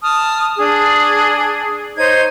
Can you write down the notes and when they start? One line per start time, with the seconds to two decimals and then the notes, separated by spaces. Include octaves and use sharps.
0.02 A5 D#6 F6
0.57 D4 G#4
1.97 D#4 C5 C#5 G#6